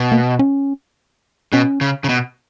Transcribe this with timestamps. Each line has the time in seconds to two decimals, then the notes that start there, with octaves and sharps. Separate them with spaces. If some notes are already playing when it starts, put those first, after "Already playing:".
Already playing: B2
0.12 A#3
0.39 C#4
1.53 B2 C#4
1.81 C#3
2.04 C#3
2.09 B2